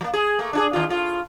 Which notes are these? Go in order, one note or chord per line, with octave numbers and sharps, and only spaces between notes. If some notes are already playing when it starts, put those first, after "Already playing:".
F#3 A#3
G#4
A3 A#3
D4 E4 G#4
D#2 F4
A2 F4